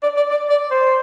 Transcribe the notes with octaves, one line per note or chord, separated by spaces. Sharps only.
D5
D5
D5
D5
C5